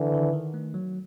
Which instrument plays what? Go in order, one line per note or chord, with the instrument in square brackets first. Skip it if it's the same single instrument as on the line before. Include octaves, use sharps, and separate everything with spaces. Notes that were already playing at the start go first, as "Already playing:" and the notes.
Already playing: [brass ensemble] D3 E3
[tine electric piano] D#3
D#3
A3
F#3